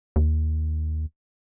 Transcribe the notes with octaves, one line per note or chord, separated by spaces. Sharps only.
D#2